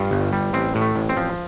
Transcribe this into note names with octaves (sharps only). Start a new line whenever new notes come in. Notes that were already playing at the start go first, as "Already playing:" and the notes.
Already playing: G2 F4
G1
G3
A1 C4
A2
A3
A1
C4
F3